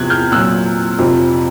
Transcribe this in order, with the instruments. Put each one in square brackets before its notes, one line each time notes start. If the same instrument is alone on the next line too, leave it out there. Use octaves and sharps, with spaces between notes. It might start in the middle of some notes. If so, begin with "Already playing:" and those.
Already playing: [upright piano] E2 C3 F3 F#6 G#6
F6 G6
A#2 F#3 E6 F#6
F2 C3 F3